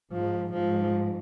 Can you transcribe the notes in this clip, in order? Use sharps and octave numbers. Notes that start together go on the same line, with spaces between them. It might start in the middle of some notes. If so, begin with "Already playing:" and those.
G#2 F3
G#2 F3